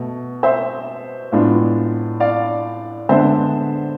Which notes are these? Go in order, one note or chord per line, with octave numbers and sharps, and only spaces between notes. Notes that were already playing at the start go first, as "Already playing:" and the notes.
Already playing: B2 A3
C5 E5
A2 G#3 B3 D4 F4
D5 F5
D3 G#3 B3 D4 C5 E5